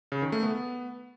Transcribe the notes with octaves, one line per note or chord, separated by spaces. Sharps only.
C#3
D#3
A3
B3